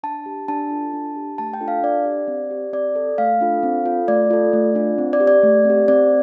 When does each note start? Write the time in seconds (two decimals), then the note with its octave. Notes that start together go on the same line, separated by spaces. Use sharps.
0.03 D4 A5
0.26 G4
0.48 D4 A5
0.71 F4 A4
0.93 D4
1.16 G4
1.38 A3 A5
1.54 G5
1.61 D4 F4 A4
1.68 F5
1.83 D4 D5
2.05 G4
2.28 C4
2.51 G4
2.73 C4 D5
2.96 A4
3.18 A3 F5
3.41 D4 F4 A4
3.63 C4
3.85 F4 A4
4.08 A3 D5
4.30 F4 A4
4.53 A3
4.75 D4 F4
4.98 C4
5.13 D5
5.20 G4
5.27 D5
5.43 A3
5.65 C4 G4
5.88 C4 D5